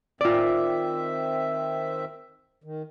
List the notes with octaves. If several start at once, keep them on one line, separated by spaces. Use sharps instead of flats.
D#3 C4 F4 D5 E5
D#3